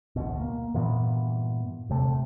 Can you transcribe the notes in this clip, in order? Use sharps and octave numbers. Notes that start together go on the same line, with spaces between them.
A1 D2 B2
A#3
G2 A#2 E3 B3
E1 C3 A3